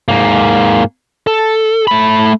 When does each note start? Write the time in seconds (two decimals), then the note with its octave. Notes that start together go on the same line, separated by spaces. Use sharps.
0.08 G#2 A#3
1.27 A4
1.88 A3 B5